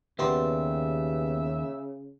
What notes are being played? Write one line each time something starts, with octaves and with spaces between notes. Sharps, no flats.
D#2 C#3 B3 G4 D5 E5 C6